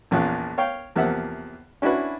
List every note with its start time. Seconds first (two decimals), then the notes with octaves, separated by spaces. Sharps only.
0.11 A#1 E2 C#4 F4 C#5 F#6
0.58 C#5 F5 G5
0.96 E2 C3 F3 A#3 E5 F#5
1.82 C#4 D4 E4 F#4 B4